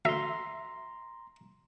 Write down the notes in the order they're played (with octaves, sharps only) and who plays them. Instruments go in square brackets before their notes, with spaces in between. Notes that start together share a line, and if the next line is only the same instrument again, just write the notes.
[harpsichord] D2 [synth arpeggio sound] E5 [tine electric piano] A#5 C6